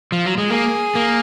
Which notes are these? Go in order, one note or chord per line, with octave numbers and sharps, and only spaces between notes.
F3
F#3
G#3
A#3 G#4
A#3